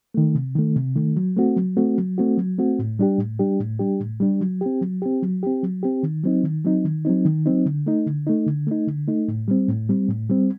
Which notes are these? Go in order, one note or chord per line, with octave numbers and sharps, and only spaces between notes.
D#3 A3
C3
D#3 A3
C3
D#3 A3
F#3
A3 C4 F#4
F#3
A3 C4 F#4
F#3
A3 C4 F#4
F#3
A3 C4 F#4
A2
G3 D4 G4
A2
G3 D4 G4
A2
G3 D4 G4
A2
G3 D4 G4
F#3
C4 G4
F#3
C4 G4
F#3
C4 G4
F#3
C4 G4
D#3
F#3 C4 D#4
D#3
F#3 C4 D#4
D#3
F#3 C4 D#4
D#3
F#3 C4 D#4
D3
A3 D#4
D3
A3 D#4
D3
A3 D#4
D3
A3 D#4
A2
G3 C4
A2
G3 C4
A2
G3 C4